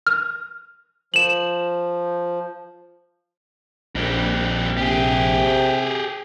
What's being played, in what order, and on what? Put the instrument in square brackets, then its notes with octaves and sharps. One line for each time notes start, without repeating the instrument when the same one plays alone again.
[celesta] F6
[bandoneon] F3 [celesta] E7 F#7
[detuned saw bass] A#1 [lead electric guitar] F2 G3
[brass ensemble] C3 [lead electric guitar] G4 G#4